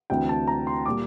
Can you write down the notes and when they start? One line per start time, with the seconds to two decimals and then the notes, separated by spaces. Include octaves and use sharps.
0.10 D2 C3 E3 G5
0.29 A5
0.48 A#5
0.67 C6
0.86 A#2 G3 D6